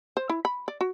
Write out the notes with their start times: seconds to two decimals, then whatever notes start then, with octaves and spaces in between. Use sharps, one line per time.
0.17 C5
0.30 E4
0.45 B5
0.68 D5
0.81 F#4